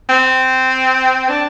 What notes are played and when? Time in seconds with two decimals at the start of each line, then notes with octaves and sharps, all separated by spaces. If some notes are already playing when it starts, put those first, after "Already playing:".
0.09 C4
1.29 D4